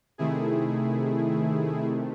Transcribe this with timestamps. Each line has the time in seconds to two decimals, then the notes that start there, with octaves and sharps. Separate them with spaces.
0.18 C3 D#3 A3 E4 G#4